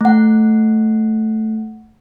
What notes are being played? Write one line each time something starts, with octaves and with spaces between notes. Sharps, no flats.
A3 F#5